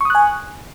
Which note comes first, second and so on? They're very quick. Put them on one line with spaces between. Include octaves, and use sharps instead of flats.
C#6 D#6 F#6 G#5